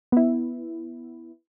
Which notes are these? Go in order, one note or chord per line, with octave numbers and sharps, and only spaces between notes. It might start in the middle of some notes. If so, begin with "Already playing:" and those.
B3 E4